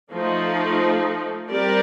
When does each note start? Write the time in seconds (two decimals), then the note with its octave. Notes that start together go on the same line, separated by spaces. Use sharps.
0.12 F3 A3 D#4
1.50 G3 C4 G4 A#4 D5